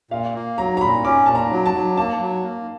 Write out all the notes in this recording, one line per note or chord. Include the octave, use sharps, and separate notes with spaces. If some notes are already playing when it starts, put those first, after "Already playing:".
A#2 F5
A#3
F#3 A#5
A#5
A#2 B5
C#4 D6
A#2 A5
A#5
F#3
A5
F#3
A#3 A5
F#3
A#3